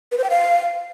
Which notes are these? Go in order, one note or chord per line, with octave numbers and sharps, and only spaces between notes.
B4
C5
G5
F5